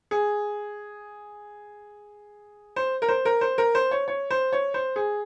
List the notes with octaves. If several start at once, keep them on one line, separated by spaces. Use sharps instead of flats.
G#4
C5
A#4
C5
A#4
C5
A#4
C5
C#5
C#5
C5
C#5
C5
G#4